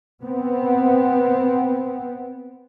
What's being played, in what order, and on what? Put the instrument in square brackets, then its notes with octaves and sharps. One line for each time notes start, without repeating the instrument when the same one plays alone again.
[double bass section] B3 C4